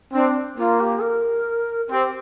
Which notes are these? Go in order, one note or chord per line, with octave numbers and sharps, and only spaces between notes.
C4 D4
A#3 F4
G4
A#4
C4 G4